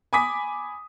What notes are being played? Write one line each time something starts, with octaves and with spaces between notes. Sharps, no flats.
G#5 B5 D6 D#6 B6